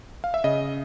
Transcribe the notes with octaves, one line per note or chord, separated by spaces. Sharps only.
F5
E5
C#3 D#5